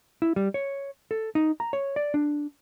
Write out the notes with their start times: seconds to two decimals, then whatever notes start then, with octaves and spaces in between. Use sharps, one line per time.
0.22 E4
0.36 G3
0.54 C#5
1.11 A4
1.35 D#4
1.60 A#5
1.73 C#5
1.96 D5
2.14 D4